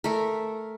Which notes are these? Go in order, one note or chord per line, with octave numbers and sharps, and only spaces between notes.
A3 A#4